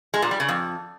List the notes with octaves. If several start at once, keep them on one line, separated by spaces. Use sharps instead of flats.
G#3
A#2
G3
C#3
F2